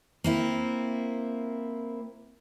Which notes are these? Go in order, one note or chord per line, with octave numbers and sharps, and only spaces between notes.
A#3 C4 E4